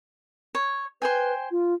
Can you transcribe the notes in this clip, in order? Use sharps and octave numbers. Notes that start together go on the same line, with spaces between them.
C#5
B4 C5 G5 G#5
F4